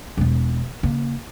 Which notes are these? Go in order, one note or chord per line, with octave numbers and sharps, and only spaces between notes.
E1 B3
C#3 A#3